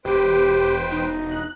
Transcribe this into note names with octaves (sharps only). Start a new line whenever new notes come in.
E1 G4 B4 C5 G5
D#4
F#6